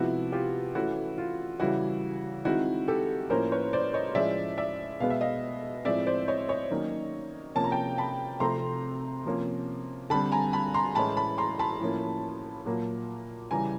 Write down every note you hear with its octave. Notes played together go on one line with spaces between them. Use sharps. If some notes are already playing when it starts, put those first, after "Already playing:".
Already playing: C3 F3 G#3 B3 E4 F#4
F4 G4
E3 A3 C#4 E4 F#4
F4
C#3 E3 G3 E4 F#4
D#3 G#3 C4 E4 F#4
G4 A4
A2 F3 A#3 C#4 A#4 C5
B4 C#5
C5 D5
C#5 D#5
A2 F3 G#3 C#4 D5 E5
D5 E5
B2 G#3 B3 F5
E5
D#5 F5
A2 F3 G#3 C4 D5 E5
C5 D5
C#5 D#5
C#5 D#5
D#3 F#3 A#3 C#4
C3 F3 A#3 C#4 A5
A#5
G5 A5
A5 B5
C3 F3 A3 C4 A#5 C6
C3 F3 A#3 C#4
D3 G3 C4 A5 B5
G#5 A#5
A5 B5
A#5 C6
A2 E3 G#3 C#4 A5 B5
A5 B5
A#5 C6
A5 B5
A2 F3 A#3 C#4
A#2 F#3 A#3
C#3 E3 G3 G#5 A#5